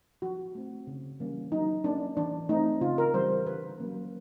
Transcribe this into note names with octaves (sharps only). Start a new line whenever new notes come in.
F3 F#4
A3 C4
C#3
E3 G3 A#3 C#4
F#3 D#4
A#3 C#4 D4
E3 D4
A3 C4 D#4
C#3 F4
A#4
E3 G3 C5
D3 B4
F#3 A#3 C#4